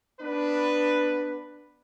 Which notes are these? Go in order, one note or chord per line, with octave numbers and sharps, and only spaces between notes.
B3 D4 B4